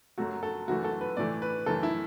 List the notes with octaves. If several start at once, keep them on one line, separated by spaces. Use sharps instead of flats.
F#2 F#3 A3 F#4
A4
F#2 E3 A3 F#4
A4
B4
A2 E3 A3 D5
B4
F#2 E3 A3 A4
E4